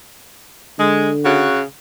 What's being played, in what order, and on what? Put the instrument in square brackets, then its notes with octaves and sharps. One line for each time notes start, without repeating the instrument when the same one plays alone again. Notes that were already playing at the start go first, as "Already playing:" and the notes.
[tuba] D3 [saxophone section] G#3
[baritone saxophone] C#3 [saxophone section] F#4